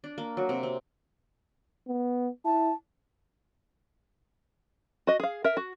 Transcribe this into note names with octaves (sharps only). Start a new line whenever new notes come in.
D4
A#3
F#3
C3
C4
B3
E4 A5
F#4 D#5
G#4 F5
A#4 E5
F#4